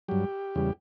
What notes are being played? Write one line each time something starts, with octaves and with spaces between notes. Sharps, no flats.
G2 F#3 G4
E2 C#3 G3